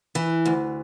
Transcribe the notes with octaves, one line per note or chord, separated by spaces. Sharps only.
E3
D2